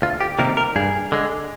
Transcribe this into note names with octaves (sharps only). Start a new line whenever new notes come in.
D2 F4
G4
C3 D#3 G3 A#3 A#4
A#4
G2 G#4
D3 G#3